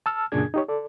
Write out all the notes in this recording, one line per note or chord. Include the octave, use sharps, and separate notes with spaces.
A5 E6 F6
F#2 A#2 C#3 D4 G#4 G#6
D#4 G4 C#5
A4 D5